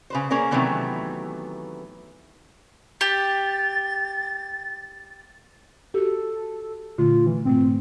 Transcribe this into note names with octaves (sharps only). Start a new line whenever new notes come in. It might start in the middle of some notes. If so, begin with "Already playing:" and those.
C#3 B4 C5
A#3 C#4 G#4 A#4 C5
C3 D#3 E3 F#3 A3 B3
G4 A6
F#4 G4 A4
A#2 D3 A3 F4
E3
G#2 B2 A3 C4